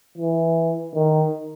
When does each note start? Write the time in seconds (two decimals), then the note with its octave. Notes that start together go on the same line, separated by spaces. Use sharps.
0.18 E3
0.95 D#3